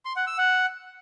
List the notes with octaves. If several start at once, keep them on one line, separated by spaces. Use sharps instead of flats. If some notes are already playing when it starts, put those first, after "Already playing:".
C6
F#5
E6
F#5